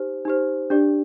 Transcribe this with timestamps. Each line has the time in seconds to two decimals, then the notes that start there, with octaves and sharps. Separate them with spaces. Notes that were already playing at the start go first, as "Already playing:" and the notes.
Already playing: D#4 G4 C5
0.25 D#4 G4 C5
0.70 D4 G4 D5